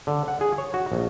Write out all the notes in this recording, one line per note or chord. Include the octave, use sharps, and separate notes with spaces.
D3
F#5
G#4
C#5
F#4
A#1